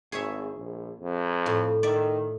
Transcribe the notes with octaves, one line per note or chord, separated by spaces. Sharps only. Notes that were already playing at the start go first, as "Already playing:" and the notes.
G#1 G#4 C#5 E5
A#1
F2
A2
D#3 D5 E5